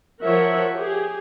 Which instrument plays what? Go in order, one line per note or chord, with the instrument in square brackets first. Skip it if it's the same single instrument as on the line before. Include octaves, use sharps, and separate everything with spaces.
[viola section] F3 A#4 C#5 E5 F#5
G4 G#4